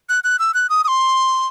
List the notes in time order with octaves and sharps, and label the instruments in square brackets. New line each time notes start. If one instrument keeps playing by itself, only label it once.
[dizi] F#6
F#6
E6
F#6
D#6
D#6
C6